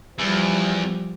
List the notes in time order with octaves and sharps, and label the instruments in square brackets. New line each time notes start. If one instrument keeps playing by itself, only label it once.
[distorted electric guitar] E2 [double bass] F3 G3